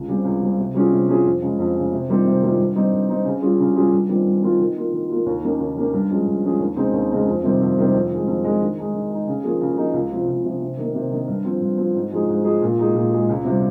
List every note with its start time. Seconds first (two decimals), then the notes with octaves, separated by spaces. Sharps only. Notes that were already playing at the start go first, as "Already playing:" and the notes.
Already playing: C#2
0.08 C#3 G3 C4
0.24 C#2
0.41 C#3 G3 C4
0.58 C3
0.74 G3 C#4 F4 G#4
0.92 C3
1.09 G3 C#4 F4 G#4
1.25 F2
1.42 C#3 G#3
1.59 F2
1.76 C#3 G#3
1.92 C3
2.09 D#3 G3 C4 F4
2.26 C3
2.41 D#3 G3 C4 F4
2.58 G2
2.75 G3 C4 D#4
2.92 G2
3.09 G3 C4 D#4
3.25 C#3
3.42 G3 C#4 F4 G#4
3.60 C#3
3.76 G3 C#4 F4 G#4
3.92 G2
4.09 D#3 G3 C4 F4
4.26 G2
4.43 D#3 G3 C4 F4
4.60 D#3
4.76 A#3 F4
4.92 D#3
5.09 A#3 F4
5.26 D#2
5.43 D#3 A#3 C#4 G4
5.60 D#2
5.76 D#3 A#3 C#4 G4
5.93 G2
6.10 F3 G#3 C#4 G#4
6.26 G2
6.43 F3 G#3 C#4 G#4
6.60 D#2
6.76 C#3 G#3 C4 D#4
6.93 D#2
7.10 C#3 G#3 C4 D#4
7.26 F2
7.43 C3 D#3 G3 C4
7.60 F2
7.77 C3 D#3 G3 C4
7.93 F2
8.11 D#3 G#3
8.27 F2
8.44 D#3 G#3
8.61 D#3
8.77 G#3 D#4
8.94 D#3
9.11 G#3 D#4
9.28 C#3
9.44 F3 A#3 D#4 G#4
9.61 C#3
9.77 F3 A#3 D#4 G#4
9.94 C#2
10.11 C3 F3
10.28 C#2
10.44 C3 F3
10.61 C3
10.77 D#3 A#3
10.94 C3
11.11 D#3 A#3
11.28 G2
11.45 F3 C4
11.61 G2
11.78 F3 C4
11.94 G#2
12.11 F3 G#3 D#4 G#4
12.29 G#2
12.44 F3 G#3 D#4 G#4
12.62 A#2
12.78 G#3 D#4 G#4
12.95 A#2
13.11 G#3 D#4 G#4
13.29 C#2
13.45 C3 G3